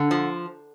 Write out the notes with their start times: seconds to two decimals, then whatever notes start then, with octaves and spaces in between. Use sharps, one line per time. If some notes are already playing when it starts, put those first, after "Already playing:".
Already playing: D3
0.11 F3